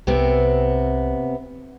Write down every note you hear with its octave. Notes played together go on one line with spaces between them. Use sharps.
C2 C3 B3 C4